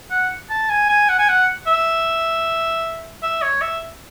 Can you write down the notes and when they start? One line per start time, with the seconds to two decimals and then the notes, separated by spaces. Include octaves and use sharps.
0.11 F#5
0.50 A5
0.70 G#5
0.89 G#5
1.09 F#5
1.19 G#5
1.29 F#5
1.67 E5
3.22 E5
3.42 C#5
3.62 E5